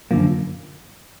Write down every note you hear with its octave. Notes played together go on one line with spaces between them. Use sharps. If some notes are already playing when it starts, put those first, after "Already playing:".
F#2 D3 F3 A#3